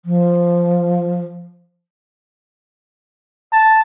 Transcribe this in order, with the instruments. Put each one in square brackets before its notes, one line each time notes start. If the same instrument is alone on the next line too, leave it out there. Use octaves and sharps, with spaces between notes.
[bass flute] F3
[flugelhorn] A5